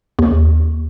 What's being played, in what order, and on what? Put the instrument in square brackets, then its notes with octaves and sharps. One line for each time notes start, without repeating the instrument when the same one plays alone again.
[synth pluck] D#2